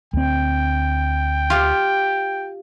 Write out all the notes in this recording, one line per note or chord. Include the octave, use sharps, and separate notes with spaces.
D2 C4 G5
F4 G4